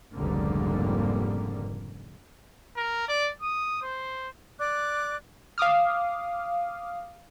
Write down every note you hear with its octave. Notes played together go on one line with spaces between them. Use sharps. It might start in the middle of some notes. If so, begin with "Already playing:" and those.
F1 C#2 G#2 D3 G3 A#3
A#4
D5
D#6
C5
D5 D6 F#6
F5 D6 D#6 F6